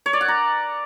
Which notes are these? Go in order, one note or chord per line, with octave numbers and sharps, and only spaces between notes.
C#5
D5
F#5
A#5